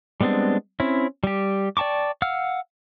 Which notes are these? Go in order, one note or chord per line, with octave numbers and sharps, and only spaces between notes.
G3 G#3 B3 C4 D4
C4 C#4 E4
G3 G4
D5 G5 A5 C#6 D6
F5 F#5 E6 F6